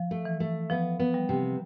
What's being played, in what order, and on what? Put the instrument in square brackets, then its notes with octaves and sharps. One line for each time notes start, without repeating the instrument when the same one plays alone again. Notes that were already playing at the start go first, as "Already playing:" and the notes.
Already playing: [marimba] F3
[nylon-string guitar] A3
[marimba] E3
[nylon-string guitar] A3
[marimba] F3 [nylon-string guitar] B3
[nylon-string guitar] B3
[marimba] G3
[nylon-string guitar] C3